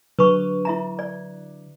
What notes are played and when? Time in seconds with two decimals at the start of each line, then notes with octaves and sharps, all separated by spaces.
0.19 D3 F#3 B4 C#6
0.65 E4 E5 A#5
0.99 D5